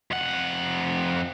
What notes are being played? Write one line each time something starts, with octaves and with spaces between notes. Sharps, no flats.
F2 F#5